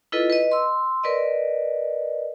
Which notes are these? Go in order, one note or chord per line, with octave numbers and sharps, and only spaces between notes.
E4 F4 A4 B4 D#5
B4 D#5
C6 E6
A#4 B4 D5 D#5